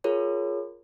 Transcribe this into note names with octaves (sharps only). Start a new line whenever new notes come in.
F4 G#4 A#4 C#5